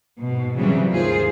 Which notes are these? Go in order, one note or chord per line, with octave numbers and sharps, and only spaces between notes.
G#2 B2
C#3 E3 F#3 G3 C4
D#2 G#2 F4 G#4 C5